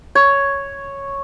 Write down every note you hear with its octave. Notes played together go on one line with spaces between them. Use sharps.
C#5